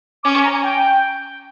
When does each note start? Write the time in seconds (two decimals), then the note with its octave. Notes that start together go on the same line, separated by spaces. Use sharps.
0.24 C#4 D6
0.34 C#6
0.44 A#5
0.53 G#5
0.63 G5